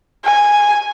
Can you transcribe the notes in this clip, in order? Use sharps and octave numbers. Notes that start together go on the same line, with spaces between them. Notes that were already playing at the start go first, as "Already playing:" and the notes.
G#5